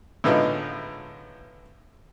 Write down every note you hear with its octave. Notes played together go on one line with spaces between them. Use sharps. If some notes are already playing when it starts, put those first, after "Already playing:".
A2 D3 G#3 B3 D#4 F4